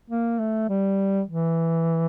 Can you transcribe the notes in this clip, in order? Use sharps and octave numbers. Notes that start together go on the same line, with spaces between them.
A#3
A3
G3
E3